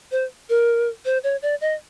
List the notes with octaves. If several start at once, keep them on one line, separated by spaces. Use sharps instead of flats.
C5
A#4
C5
C#5
D5
D#5